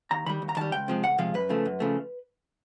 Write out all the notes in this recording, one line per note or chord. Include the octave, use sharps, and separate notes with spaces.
D#2 A#5
D#3 G3 B5
D#2
A#5
D#3 G3 A5
C#2 G5
C3 F3 G#3
C#2 F#5
C3 F3 G#3 F5
F#2 B4
C#3 F3 A3
F#2
C#3 F3 A3